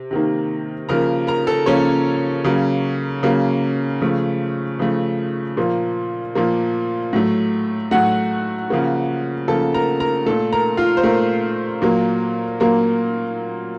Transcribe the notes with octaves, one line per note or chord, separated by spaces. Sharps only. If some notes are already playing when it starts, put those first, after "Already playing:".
Already playing: C3
C3 D#3 A#3
C#3 F3 A#3 A#4 A#5
A#4 A#5
A4 A5
C#3 F3 A#3 C#4 C#5
C#3 F#3 A#3
C#3 F#3 A#3
C#3 F3 A3
C#3 F3 A3
A#2 F3 A#3
A#2 F3 A#3
A2 F#3 A3
A2 F#3 A3 F#4 F#5
C#3 F3 A#3
C#3 F3 A#3 A4 A5
A#4 A#5
A#4 A#5
A#2 A3 A4 A5
A#4 A#5
F4 F5
C5
A#2 A3 A#4
A#2 F#3 A#3
A#2 F#3 A#3 A#4